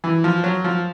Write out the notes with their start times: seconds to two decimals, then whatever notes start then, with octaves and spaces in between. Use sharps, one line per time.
0.04 E3
0.24 F3
0.44 F#3
0.64 F3